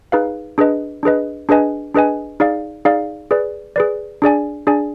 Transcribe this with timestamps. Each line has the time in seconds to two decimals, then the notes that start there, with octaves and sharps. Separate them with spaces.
0.12 D#4 G#4 B4 F5
0.58 D4 G#4 B4 D#5
1.03 D4 G#4 B4 D#5
1.49 D4 G#4 B4 D#5 G#5
1.94 D4 G#4 B4 D#5 G#5
2.40 D#4 G#4 D5 F5
2.85 D#4 G#4 D5 F5
3.31 G#4 B4 D5
3.76 G#4 B4 D5
4.22 D4 G#4 D5 G#5
4.67 D4 G#4 D5 G#5